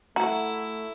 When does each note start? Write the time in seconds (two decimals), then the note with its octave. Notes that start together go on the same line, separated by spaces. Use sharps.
0.16 A3 E4 F#4 A#5